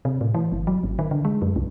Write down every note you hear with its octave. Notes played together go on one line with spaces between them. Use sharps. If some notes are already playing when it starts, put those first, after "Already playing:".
C3
A2
E3
G1
F#3
G#1
D#3
D3
G#3
F#2
C2